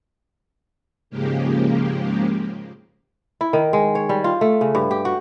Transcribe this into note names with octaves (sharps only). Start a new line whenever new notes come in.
G#2 C#3 F3 G#3 A#3 G4
E4
D#3
G#3
C#5
G3
F4
A3
C#3
G2
G4
F#4